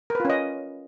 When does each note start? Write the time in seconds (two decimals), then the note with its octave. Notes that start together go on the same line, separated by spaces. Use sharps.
0.10 A#4
0.15 B4
0.20 F4
0.25 C#4
0.30 D#5